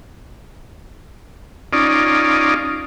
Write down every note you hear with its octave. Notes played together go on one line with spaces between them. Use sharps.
C#4 D#4 F4 D5